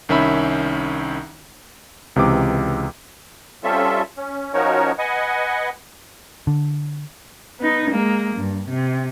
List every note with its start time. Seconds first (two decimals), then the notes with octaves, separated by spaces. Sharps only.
0.09 C2 D#3 C#4 E5 B5
2.16 C#2 C3 E3 D6
3.64 G3 C4 C#4 F4 A4 E5
4.17 C#4
4.54 F3 C#4 D#4 F#4 A#4 C#5
4.98 B4 D#5 F#5 G#5
6.47 D3
7.59 B3 D#4
7.90 G#3 A#3
8.36 G2
8.69 C3